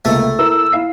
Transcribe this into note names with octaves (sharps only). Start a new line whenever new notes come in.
C#2 C3 A3 A#3
E4 A#4 A#5 E6
E4 F5 C7